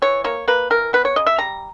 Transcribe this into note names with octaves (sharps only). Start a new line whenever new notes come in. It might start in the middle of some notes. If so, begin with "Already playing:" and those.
E3 C#5
A#3 C#5
A#3 B4
E3 A#4
B3 B4
C#5
C#3 D#5
E5
G3 A#5